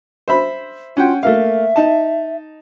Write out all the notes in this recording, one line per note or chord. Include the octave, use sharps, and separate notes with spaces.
C5 E5 B5
C#4 F4 F#5 G5
A3 A#3 E5 F5
D#4 A5